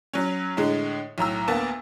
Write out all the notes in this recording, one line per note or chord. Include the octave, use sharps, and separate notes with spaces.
F#3 C#4
A2 D3 G#3
B1 A2 A#5 E6
D2 A#3 B3 A5